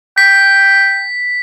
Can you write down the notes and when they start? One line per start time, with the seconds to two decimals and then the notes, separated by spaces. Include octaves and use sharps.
0.18 G5 B6